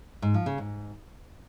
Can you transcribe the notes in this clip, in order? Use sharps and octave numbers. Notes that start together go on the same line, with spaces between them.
G#2
F3
C#3
G#2